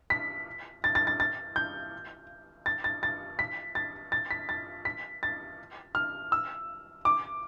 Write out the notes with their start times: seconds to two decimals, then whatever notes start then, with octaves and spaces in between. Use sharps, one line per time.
0.10 B6
0.84 A6
0.95 A6
1.07 A6
1.20 A6
1.56 G6
2.66 A6
2.84 A6
3.03 A6
3.39 B6
3.75 A6
4.12 A6
4.31 B6
4.49 A6
4.85 B6
5.23 A6
5.95 F6
6.32 E6
7.05 D6